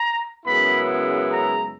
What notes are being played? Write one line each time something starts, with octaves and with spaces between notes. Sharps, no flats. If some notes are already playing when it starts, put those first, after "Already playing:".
Already playing: A#5
F#2 C#3 G#3 B3 E4 B5
A#5